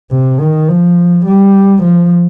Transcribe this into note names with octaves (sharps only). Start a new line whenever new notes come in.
C3
D#3
F3
G3
F3